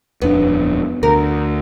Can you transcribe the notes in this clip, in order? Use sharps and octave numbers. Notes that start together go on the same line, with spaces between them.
D#1 F2 B3 D4
D2 A#4